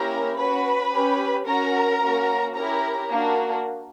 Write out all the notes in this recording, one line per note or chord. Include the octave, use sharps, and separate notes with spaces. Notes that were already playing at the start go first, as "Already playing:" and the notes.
Already playing: A#3 C#4 E4 G4 A#4 A#5
C#4 F#4 B4 B5
C#4 G4
C#4 F#4 A#4 A#5
A#3 C#4 F#4
C#4 E4 G4 A#4 A#5
A#3 D4 F#4